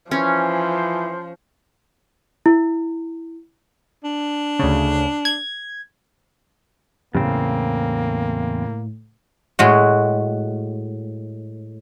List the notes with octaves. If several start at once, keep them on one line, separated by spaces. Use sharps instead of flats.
E3 F3 C#4 C5
E4
D4
D2 C#3
G#6
E2 A2 C#3 A#3 C4
A2 G#3 F#4